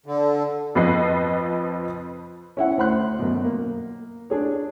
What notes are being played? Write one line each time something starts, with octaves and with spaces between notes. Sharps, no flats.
D3
F2 F3 B4 D#5 C7
C#4 E4 F#5
D2 C5 F#5 B5 C6 F#6
F#2 B2
A#3
D4 G#4 C#5